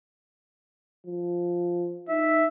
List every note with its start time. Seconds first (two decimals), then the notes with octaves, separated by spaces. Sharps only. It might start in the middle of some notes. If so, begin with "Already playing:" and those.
1.07 F3
2.09 D#4 E5